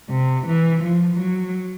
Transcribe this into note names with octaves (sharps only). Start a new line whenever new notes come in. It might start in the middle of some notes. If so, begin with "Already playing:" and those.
C3
E3
F3
F#3